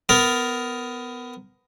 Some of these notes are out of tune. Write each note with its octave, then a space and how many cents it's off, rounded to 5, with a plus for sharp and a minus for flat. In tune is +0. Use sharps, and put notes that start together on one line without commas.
B3 +20 A#4 +0